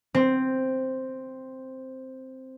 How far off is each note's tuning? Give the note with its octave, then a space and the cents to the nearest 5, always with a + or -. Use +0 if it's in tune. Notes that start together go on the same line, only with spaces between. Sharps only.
C4 +0